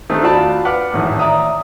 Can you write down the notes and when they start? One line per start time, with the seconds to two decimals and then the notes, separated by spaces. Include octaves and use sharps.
0.10 D#3 A3 C4 D4 D#4
0.23 F4 F#4 D5 A5 B5
0.65 B4 F#5 D6 F6
0.93 G#1 A2 D#3 E3
1.19 D5 E5 A#5 D#6